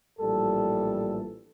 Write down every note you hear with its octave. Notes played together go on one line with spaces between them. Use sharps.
A#1 A2 E3 G3 A4